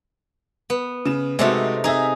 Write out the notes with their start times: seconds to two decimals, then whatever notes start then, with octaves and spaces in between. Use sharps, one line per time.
0.70 B3
1.06 C#3 E7
1.39 C3 G#3 A3 C4 D#4 F#4
1.84 D#4 G#4 E5 A#5